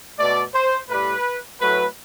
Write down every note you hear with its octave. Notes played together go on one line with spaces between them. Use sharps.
B2 A3 D5
C5
A2 G3 B4
A2 F#3 A3 B4